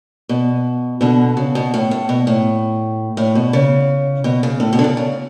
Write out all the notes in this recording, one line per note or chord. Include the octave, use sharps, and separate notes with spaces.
B2
B2 D3
C#3
B2
A2
A2
B2
A2
A2
B2
C#3
B2
C#3
A2
B2
D3
C#3
C#3